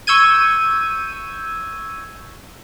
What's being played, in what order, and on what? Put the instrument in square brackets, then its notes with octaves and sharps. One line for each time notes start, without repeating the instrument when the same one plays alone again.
[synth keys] C#6 E6 G6 G#6 D#7